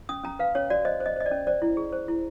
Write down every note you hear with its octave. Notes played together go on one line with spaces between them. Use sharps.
C#4 D#6
C#4 A#5
B4 F5
C#4 C#5
F#4 D5
C5 D#5
C5
D#5
C5 D#5
D5
C#4
C5 D5
E4
G#4
C5
E4